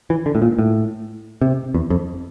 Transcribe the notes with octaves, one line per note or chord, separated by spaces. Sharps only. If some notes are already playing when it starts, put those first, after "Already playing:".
E3
D3
A2
A#2
A2
C3
E2
F2